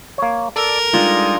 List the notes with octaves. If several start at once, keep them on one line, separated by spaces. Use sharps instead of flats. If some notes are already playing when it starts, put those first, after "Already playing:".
A#3 C#5
A4 A#4 D5
G3 G#3 D4 D#4 F4